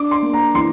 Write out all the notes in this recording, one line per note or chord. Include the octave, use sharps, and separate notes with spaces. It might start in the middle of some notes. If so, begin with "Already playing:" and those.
Already playing: D4 D6
C6
A#3
A#5
E3 C6